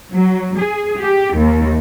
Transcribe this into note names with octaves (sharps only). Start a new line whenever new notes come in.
F#3
G#4
G4
D#2